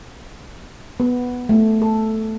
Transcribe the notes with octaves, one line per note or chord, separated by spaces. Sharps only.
B3
A3
A4